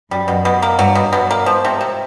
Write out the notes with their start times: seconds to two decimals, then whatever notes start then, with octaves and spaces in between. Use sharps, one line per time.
0.11 F#2 G3
0.28 B2
0.45 B2
0.62 A#3
0.79 G2 F#3
0.95 B2
1.13 B2
1.31 A#3
1.46 G#2 F3
1.65 C3
1.81 C3